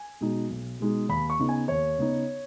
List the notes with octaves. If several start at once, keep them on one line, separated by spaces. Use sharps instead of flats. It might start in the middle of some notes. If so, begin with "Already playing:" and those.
Already playing: G#5
B2 G#3 D#4
B1
B2 G#3 D#4
D#2 B5
C#6
C#3 B3 D#4
G#5
D#2 C#5
C#3 B3 D#4